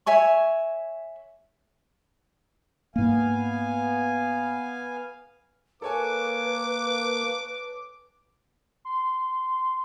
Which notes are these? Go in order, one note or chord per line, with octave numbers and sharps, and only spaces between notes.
C#5 E5 G#5 C#6
G#2 A#3 B3 F5 G#5
A#3 A4 B4 C#5 G#5 D6
C6